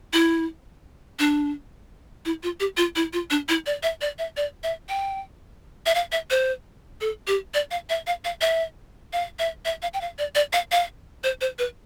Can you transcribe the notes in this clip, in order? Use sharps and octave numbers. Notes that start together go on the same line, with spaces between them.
E4
D4
E4
F4
G4
F4
E4
F4
D4
E4
D5
E5
D5
E5
D5
E5
G5
E5
F5
E5
C5
A4
G4
D5
F5
E5
F5
F5
E5
F5
E5
E5
F5
G5
F5
D5
D5
F5
F5
C5
C5
B4